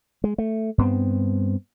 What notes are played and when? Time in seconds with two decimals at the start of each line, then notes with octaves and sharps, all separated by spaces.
0.24 G#3
0.38 A3
0.78 G2 B3 C4